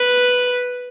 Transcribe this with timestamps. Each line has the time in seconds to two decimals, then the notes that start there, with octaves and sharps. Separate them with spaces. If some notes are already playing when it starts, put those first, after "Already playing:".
Already playing: B4